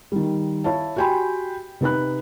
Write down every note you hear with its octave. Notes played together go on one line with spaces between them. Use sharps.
D#3 G3
E4 C#5 F5 A5
F#4 G4 G5 G#5 B5 C6
C3 D#4 B4 B5 F#6